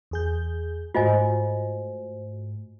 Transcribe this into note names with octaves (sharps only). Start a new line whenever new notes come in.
E2 G#4 G6
G#2 A3 F4 F#4 C5 D#5 G#5